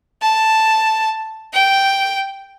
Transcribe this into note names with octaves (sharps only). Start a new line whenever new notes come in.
A5
G5